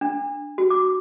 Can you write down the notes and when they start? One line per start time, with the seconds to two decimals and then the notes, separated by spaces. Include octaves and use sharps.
0.01 D4
0.58 F#4
0.70 D6